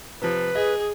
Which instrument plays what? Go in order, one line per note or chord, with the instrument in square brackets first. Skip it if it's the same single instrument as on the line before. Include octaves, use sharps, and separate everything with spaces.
[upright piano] C3 F3 [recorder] B4
[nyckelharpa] G#4 [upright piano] D#5